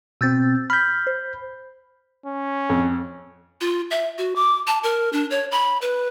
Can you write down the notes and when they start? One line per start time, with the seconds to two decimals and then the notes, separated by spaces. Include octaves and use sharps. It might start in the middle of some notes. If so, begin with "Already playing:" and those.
0.21 B2 C4 E6 G6 A6
0.70 B5 F6 G6 B6
1.07 C5
2.26 C#4
2.69 F2
3.61 F4
3.91 E5
4.18 F#4
4.36 D6
4.67 A5
4.83 A#4
5.13 D4
5.31 C#5
5.51 B5
5.82 B4